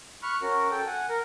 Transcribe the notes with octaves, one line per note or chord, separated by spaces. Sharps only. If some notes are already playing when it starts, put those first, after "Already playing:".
B5 C#6 F6 F#6
C#4 F#4 A#4
A4 G5
F#5 G#5
A#4